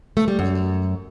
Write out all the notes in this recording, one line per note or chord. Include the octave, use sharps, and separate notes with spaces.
A3
G3
F#2